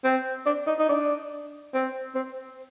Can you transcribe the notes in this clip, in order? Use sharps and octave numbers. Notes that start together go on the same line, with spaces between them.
C4
D4
D#4
D#4
D4
C4
C4